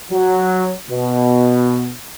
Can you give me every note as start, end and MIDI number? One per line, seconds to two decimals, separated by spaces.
0.12 0.73 54
0.90 1.91 47